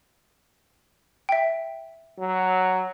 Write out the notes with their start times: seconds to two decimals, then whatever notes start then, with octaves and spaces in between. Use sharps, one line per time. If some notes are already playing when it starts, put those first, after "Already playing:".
1.29 E5 G5
2.18 F#3